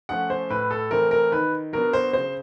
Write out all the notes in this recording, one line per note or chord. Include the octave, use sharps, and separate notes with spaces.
F3 A3 C#4 F#5
C5
A2 B4
A4
E3 A3 C4 A#4
A#4
D#3 B4
F#3 B3 D4 A#4
C5
C#3 C5